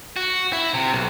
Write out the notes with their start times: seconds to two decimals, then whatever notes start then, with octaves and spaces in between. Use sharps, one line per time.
0.16 F#4
0.53 E4
0.74 C3
0.93 B1